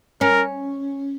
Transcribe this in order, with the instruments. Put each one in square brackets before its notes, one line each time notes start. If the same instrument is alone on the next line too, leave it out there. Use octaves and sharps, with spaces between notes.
[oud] C#4 [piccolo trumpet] A#4